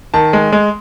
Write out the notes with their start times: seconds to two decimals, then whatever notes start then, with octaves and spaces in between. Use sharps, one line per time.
0.14 D#3 A5
0.33 G#3
0.52 G#3